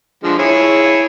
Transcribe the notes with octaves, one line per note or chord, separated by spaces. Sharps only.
D3 F3 G#3
E4 G#4 C#5